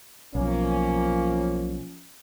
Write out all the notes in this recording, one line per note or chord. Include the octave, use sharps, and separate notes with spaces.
B1 F3 A#3 C#4